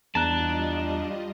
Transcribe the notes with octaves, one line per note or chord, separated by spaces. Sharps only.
E2 G3 D4 F4 D#5 A5 A#5 F#6